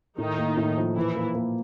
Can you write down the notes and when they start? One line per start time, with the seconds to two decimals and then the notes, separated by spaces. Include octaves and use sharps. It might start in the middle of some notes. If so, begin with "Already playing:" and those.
0.18 A2 D#3 D#4
0.38 A#3
0.57 A2
0.77 F3
0.96 A#2 E3 E4
1.16 A#3
1.35 A#3